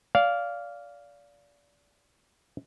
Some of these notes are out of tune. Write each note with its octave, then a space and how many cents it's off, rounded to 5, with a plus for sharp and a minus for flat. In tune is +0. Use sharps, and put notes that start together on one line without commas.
D5 -30 F5 +0